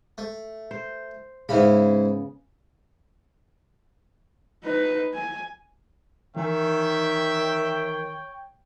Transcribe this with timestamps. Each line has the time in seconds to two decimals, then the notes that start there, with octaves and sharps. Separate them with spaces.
0.18 A3
0.71 C5
1.49 G#2 C#3 B3 E4 B5
4.64 D#4 B4
5.14 G#5
6.36 D#3 E3 C#5 E5 G5 G#5